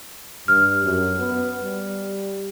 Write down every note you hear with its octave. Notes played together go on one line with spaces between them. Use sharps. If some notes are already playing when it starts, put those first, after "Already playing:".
G2 F6
F#2
B3
G3